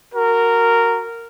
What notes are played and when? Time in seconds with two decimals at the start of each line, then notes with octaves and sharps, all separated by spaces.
0.13 F#4 A#4